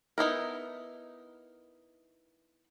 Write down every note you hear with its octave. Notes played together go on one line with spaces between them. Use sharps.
B3 D#4 E4 A#4